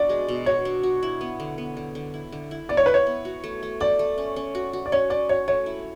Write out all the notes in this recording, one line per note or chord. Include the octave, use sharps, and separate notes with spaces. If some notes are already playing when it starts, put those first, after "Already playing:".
Already playing: B2 D4 F#4 D5
G#3
B2
F#4 C#5
D4
F#4
E4
B3
D3
B3
D3
D3
E4
D3
E4
B3 D5
C#5
E4 B4
C#5
B3
F#4
A3
A3
A4 D5
A3
C#4
C#4
F#4
F#4
D5
C#4 C#5
C#4 D5
F#4 C#5
A3 C#5
E4